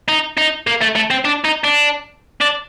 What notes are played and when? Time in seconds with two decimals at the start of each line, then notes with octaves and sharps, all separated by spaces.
0.08 D#4
0.38 D#4
0.67 A#3
0.81 A3
0.96 A3
1.11 C4
1.25 D4
1.44 D#4
1.64 D4
2.41 D4